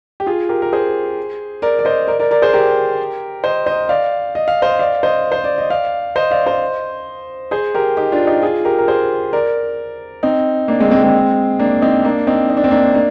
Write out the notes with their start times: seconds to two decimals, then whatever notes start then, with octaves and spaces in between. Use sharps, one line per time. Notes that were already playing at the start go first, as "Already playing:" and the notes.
0.20 G4
0.27 F4 G#4
0.49 G4 A#4
0.62 A#4
0.73 G#4 C5
1.62 A#4 D5
1.79 D5
1.85 C5 D#5
2.08 A#4 D5
2.19 A#4 D5
2.31 A#4 D5
2.42 G#4 C5
2.53 G4 A#4
3.44 C5 D#5
3.66 C5 D#5
3.89 D5 F5
4.35 D#5
4.48 F5
4.62 C5 D#5
4.79 D5 F5
5.03 C5 D#5
5.32 C5
5.44 D5
5.58 D#5
5.70 D5 F5
6.16 C5 D#5
6.31 D5 F5
6.46 C5 D#5
7.51 G#4 C5
7.74 G4 A#4
7.97 D#4 G4
8.12 D4 F4
8.27 D#4 G4
8.42 F4 G#4
8.65 G4 A#4
8.78 A#4
8.88 G#4 C5
9.33 A#4 D5
10.23 C4 D#4
10.68 A#3 D4
10.80 G#3 C4
10.91 G#3 C4
11.02 G#3 C4
11.59 A#3 D4
11.82 C4 D#4
12.04 A#3 D4
12.27 C4 D#4
12.50 D#4
12.57 D4
12.64 C4
12.71 A#3 D4
12.95 A#3 D4